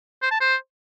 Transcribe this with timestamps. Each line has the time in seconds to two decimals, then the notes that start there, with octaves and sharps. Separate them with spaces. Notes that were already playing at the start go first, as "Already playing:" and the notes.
0.22 C5
0.31 A5
0.41 C5